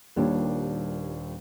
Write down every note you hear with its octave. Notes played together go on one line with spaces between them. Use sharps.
D#1 D#2 A#2 G3 D4 C#5